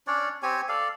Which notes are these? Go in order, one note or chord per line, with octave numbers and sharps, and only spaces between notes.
C#4 D4 C#5 D5
C4 G4 C#5 G#5
A4 D5 F5